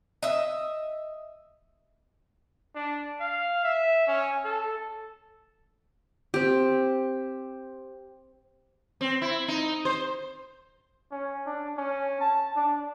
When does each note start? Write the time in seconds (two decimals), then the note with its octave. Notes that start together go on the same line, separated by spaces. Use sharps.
0.22 D#5 E5
2.75 D4
3.20 F5
3.63 E5
4.07 C#4
4.44 A4
6.34 C4 G4
9.01 C4
9.22 E4
9.48 D#4
9.85 C5
11.12 C#4
11.46 D4
11.77 C#4
12.21 A5
12.56 D4